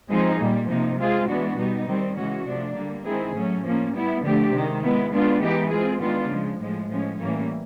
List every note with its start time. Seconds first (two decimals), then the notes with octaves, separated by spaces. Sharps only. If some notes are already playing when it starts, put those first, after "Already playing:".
0.09 F3 G#3 C4 D#4 G#4
0.39 A#2 G3 A#3
0.68 C3 F3 A#3 D#4
0.98 G#3 C4 F4 G#4
1.27 E3 G#3 B3 D4 F#4
1.57 B2 G3 B3 D#4
1.87 D#3 G3 C4
2.17 C#3 E3 G#3 C#4 F#4
2.46 C3 F3 A3 D4
2.75 D3 G3 A#3
3.05 D#3 G#3 C4 E4 G#4
3.35 A2 F#3 A3 C#4
3.64 F3 A#3 C#4
3.93 G3 B3 E4
4.23 D3 F3 A3 D4 G4
4.52 C3 D#3 G#3
4.82 G#3 B3 E4
5.12 G#3 B3 D4 F4
5.41 E3 G#3 B3 D#4 G4
5.70 G#3 C4 F4 G#4
6.00 D#3 G#3 B3 D4 F4
6.30 C#3 F3 G#3
6.60 A2 F3 G#3
6.89 A2 F3 G#3 C#4
7.18 A2 E3 G3 A#3 C#4